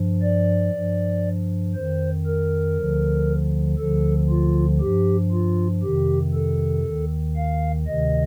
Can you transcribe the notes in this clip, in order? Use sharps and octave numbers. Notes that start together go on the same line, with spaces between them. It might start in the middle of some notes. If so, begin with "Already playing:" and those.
Already playing: G2 F3
D5
G2 F3
F2 D#3 C5
A#4
D2 D3 F3
D2 D3 F3 A4
F4
G2 F3 G4
F4
F2 C3 D#3 G4
A4
D#2 D#3
F5
D2 C3 D#3 D#5